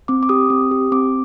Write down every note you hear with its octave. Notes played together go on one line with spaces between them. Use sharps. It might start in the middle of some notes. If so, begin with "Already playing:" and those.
C4 D6
D6
G4 D#6
C4
G4
C4 D6